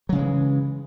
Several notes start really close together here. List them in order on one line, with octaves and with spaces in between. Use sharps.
F#3 C#3 G#3 E3